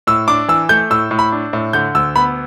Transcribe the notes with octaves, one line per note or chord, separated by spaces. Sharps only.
A2 E6
D4 D6
E3 E6
A3 G6
A2 E6
A2
B5
D4
A2
D3 G6
D2 E6
B3 B5